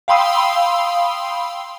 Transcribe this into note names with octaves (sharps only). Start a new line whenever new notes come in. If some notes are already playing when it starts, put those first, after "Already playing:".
F5 G5 B5 C6 D#6 E6